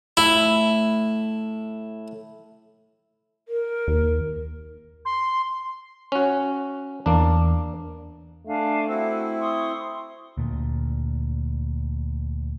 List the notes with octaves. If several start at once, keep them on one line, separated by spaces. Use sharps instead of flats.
A2 E4
A#4
D#2
C6
C#4 F#4
E2 A#3 D4
A3 D4 F5 G#5
C4 E4 F#4
C6 C#6 D#6
D2 A#2